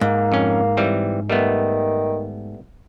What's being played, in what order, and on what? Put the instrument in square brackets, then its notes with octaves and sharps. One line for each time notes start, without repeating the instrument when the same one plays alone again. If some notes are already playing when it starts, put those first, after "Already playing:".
[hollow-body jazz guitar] G#2 [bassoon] A#3
[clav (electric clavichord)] F2 C#4
E3 G3 C4
[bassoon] D#3 [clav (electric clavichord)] G3 A3 B3